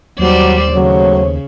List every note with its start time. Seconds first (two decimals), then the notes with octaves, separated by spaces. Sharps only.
0.19 D#2 F#3 G3 C5 D5
0.73 C#3 F#3 A3 C5 C#5